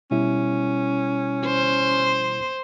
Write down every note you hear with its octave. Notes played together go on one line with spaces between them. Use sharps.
B2 G3 C#4 E4
C5